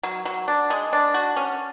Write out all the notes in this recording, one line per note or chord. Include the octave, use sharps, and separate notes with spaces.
F#3
F#3
D4
G#3
D4
F#4
C#4